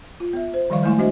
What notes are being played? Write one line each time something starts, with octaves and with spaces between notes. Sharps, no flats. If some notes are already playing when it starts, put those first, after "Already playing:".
F4
B3 E5
C5
D#3 F3 G3 D5 F5 C#6
G#3 A3 E4 G#5 C6 C#6
B3 D4 F#4 C5 D#5 E5